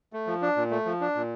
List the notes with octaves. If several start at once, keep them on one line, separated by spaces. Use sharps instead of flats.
A3
F3
D4
A#2
A3
F3
D4
A#2